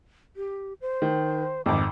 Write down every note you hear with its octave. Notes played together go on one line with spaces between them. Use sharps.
G4
C5
D#3
G#1 F2 D6